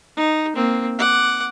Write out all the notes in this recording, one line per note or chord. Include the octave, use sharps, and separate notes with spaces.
D#4
A#3 C4
F#5 D6